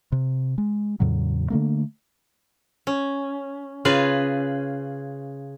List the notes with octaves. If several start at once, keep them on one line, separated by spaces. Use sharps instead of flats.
C3
G#3
E2 A2 C#3 F#3
D3 D#3 A3 A#3
C#4
C#3 F4 G#4 B4